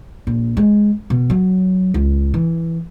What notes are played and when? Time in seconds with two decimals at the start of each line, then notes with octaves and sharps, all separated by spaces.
0.27 A#1
0.57 G#3
1.10 B2
1.30 F#3
1.94 C#2
2.34 E3